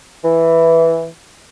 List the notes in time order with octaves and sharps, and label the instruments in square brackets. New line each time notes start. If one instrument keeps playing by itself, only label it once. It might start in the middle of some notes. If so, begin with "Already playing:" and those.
[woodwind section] E3